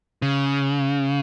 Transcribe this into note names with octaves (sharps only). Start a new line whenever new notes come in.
C#3